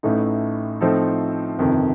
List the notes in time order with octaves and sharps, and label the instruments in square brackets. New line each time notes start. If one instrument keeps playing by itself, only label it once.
[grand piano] A1 A2 A3 D#4
A2 F3 C4 D#4 A4
G1 F2 C3 D#3